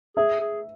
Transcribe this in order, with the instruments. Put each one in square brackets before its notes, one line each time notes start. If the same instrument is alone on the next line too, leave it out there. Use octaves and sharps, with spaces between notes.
[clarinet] G#4 [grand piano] E5
[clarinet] G#4